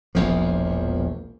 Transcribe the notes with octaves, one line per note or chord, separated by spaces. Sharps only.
E1 A#1 E2 F3